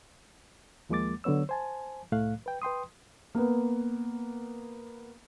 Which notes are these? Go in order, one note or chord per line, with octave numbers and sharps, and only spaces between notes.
D#2 F3 G#3 A#3 D6 A6
D3 F#3 B3 C#5 E6
C5 G#5 A5
C2 A2 A3 F5 F#6
B4 G5
B4 G5 C6 D#6
A#3 B3